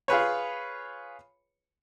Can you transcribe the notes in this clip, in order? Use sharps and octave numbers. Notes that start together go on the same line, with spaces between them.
F4 G#4 B4 C#5